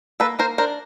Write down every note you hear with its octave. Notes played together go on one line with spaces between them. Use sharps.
A#3 A4 B4
A#3 A#4 C5
D4 A#4 C5